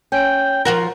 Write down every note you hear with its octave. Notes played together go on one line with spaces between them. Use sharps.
C#4 G5
F3 F#4 A#4